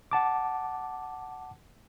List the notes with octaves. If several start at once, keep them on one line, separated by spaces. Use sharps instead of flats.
F#5 A5 D6